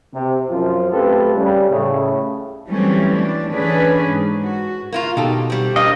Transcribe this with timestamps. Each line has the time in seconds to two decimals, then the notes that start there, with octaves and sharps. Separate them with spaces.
0.14 C3
0.50 F#2 F3 F4
0.92 A3 C4 F4 G4 A4 B4
1.36 C#3 G3
1.70 A2 C#3
2.69 E3 F#3 G3 A3 C4 C#4
3.17 D4
3.50 D3 E3 C#4 D4 G#4 B4
4.07 G#2
4.44 F#4
4.93 A#3 E4 F4
5.17 B2 D#4 F#4 G4 A4
5.50 G3 C4
5.76 D4 A#4 C#5 D#5 F5